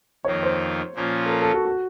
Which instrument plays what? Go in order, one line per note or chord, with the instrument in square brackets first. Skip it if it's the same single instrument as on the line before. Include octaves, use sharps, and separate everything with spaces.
[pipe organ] F2 D#3 A#3 F4 [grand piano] C#5
[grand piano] C5
[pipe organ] A#2 F3 A#3 C#4 F4
[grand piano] A4
A#4
A4
F#4
F#4